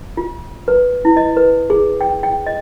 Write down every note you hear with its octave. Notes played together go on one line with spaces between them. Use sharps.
F4
B4
E4
D#5
B4
G#4
G5
G5
D#5